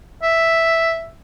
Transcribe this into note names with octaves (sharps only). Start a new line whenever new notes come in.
E5